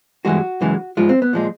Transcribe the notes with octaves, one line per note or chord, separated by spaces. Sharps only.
G2 E3 G#3 F#4
F#2 C#3 E3 G#3
G#2 F3 G#3 F4
C4
B3
A#2 F3 G#3